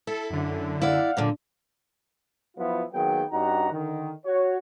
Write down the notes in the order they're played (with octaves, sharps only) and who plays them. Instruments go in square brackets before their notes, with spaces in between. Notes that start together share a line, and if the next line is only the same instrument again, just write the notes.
[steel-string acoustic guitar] E4 [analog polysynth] A4
[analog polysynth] F#2 D3
[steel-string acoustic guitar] E4 D5 [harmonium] F5 F#5
[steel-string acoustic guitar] F#2 A#2 D3
[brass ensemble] F3 F#3 B3 E4 F4
D#3 F#3 A#3 B3 G#4 G5
G2 C#4 D#4 F#4 F#5 A#5
D3 D#3
F#4 C#5